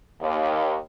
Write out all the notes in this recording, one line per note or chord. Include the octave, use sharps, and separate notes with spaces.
D#2